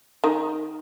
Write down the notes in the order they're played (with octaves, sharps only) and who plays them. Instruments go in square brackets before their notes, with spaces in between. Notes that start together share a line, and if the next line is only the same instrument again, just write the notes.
[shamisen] D#3